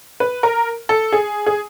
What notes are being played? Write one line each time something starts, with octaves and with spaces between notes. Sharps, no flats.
B4
A#4
A4
G#4
G#4